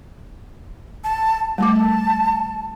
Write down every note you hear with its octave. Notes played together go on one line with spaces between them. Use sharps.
A5
G3 A3 A5 D6